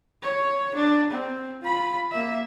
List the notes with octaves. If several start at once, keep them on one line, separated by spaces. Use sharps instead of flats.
C#5
D4
C4
F4 B5
A#3 E5